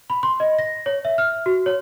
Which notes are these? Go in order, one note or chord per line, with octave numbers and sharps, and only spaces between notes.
B5
C6
D#5
A#6
C#5
E5
F6
F#4
C#5